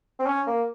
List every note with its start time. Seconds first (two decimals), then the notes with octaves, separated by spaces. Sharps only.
0.19 C4
0.26 C#4
0.47 A#3